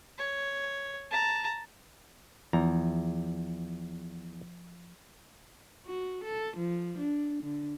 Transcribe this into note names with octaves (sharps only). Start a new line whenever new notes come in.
C#5
A5 A#5
E2 F3 A#5
F#4
A4
F3
D4
D3